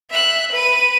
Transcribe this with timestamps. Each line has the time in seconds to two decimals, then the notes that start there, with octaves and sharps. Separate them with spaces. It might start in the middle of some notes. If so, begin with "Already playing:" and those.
0.10 E5 F#6
0.52 B4 D#7